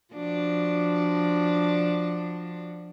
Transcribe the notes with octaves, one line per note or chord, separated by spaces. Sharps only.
F3 D4 F#4